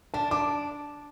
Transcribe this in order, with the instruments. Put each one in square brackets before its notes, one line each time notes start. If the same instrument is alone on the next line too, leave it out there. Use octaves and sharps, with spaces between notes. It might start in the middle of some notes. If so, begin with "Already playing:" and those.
[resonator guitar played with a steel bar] D4 [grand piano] A5
[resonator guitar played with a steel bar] D4 [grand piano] D6